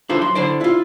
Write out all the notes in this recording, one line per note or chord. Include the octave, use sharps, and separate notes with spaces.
D4 E4 F4 A4 B4 C5
F#3 C6
D3 E4 C5 D5
E4 F4